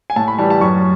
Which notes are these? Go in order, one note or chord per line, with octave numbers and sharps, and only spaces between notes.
G#5
A2 A5
B5
E3 G3 A5
A5
F#2 C#6